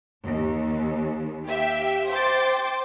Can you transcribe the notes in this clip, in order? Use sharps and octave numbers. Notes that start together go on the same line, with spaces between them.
D#2
G4 E5 F5 G5
C5 G5 C6 D6 A6